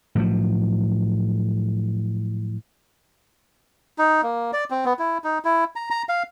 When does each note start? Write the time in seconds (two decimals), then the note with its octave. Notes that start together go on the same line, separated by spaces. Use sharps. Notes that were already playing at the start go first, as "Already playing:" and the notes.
0.15 A2 F3 F#3
3.98 D#4
4.23 A#3
4.53 D5
4.70 C4
4.85 B3
4.99 E4
5.24 D#4
5.45 E4
5.76 A#5
5.91 A#5
6.09 F5